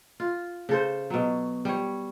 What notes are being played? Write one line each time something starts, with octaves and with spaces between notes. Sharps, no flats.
F4
C#3 A4 C5
B2 F#3
G3 C#5